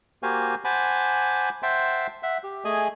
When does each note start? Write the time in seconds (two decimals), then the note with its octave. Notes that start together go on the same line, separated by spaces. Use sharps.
0.23 A#3 F#4 G4 C5 F5 G#5
0.65 C5 F#5 G#5 A5 B5 D6
1.63 C5 E5 F#5 G5 A5 C6
2.23 E5 F#5
2.44 G4
2.65 A3 G#4 D#5 G#5